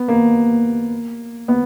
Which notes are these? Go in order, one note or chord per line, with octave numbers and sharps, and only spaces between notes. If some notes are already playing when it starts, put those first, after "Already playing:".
Already playing: B3
A#3
B3